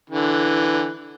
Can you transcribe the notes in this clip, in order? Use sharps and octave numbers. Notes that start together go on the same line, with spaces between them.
D3 E3